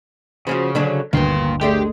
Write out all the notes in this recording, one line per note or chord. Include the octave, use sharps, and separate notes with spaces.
C#3 F3 C#4 F#4
D3 F#3 D4
G1 D2 D#3 A#3 B3 C6
G#3 A3 D4 G4